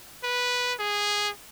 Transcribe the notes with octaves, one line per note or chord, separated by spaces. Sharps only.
B4
G#4